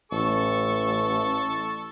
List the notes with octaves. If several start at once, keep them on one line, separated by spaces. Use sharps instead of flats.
A1 A4 C#6